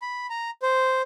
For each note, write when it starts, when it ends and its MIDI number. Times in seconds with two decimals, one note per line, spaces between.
0.02 0.27 83
0.30 0.50 82
0.62 1.02 72